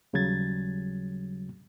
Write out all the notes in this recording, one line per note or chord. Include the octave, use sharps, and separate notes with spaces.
D#2 C#3 F#3 G3 G#6 A6